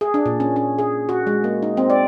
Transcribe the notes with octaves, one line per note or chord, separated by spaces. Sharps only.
G#4
D4
A#2
C#4
C#4
G#4
F#4
G#3
A#3
D#4
C4
D5